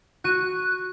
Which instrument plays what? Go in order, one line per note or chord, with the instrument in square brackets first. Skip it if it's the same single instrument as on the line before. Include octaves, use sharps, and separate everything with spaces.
[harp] F#4 D#7 [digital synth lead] F#6